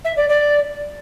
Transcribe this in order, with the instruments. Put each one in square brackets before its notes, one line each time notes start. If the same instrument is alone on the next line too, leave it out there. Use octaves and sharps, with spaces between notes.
[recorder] E5
D5
D5